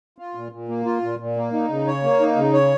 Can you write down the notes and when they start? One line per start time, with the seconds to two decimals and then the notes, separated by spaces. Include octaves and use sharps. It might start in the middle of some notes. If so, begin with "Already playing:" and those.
0.18 F4
0.35 A#2
0.52 A#2
0.69 A#3
0.85 F4
1.02 A#2
1.19 A#2
1.36 A#3
1.53 D#4
1.69 C#3
1.87 C#5
2.03 A#3
2.20 D#4
2.36 C#3
2.53 C#5